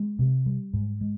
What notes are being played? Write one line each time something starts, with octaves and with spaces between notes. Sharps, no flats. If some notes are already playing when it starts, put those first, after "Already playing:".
Already playing: G#3
C3
G3
G#2
G#3